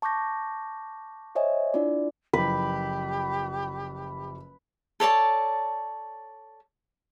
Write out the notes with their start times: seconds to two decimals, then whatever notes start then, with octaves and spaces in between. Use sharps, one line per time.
0.02 A5 C#6 D6 G6 A#6
1.35 C5 C#5 D#5 E5 G#5
1.74 D4 E4 F4 D5
2.33 F#1 F3 E4 G4 B4
5.00 A4 C#5 D5 A5